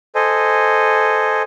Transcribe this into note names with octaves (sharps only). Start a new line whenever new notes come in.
A4 C5 D#5 G#5